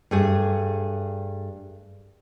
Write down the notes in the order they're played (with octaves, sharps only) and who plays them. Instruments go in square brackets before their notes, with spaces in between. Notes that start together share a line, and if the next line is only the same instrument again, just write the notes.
[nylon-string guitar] G2 A3 G#4